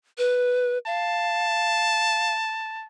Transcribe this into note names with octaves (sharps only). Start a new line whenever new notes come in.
B4
F5 A5